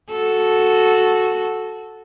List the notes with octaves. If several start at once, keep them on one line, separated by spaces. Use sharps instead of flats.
F#4 A4